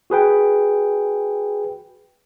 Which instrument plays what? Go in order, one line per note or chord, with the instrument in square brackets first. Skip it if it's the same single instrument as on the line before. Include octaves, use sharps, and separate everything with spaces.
[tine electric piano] F#4 G#4 B4 G5